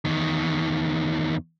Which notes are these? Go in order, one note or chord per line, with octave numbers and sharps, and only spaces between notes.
E2 D#3